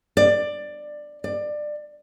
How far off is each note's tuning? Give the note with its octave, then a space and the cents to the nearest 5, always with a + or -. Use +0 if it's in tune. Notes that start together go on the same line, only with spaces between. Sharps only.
D5 +15
D5 +20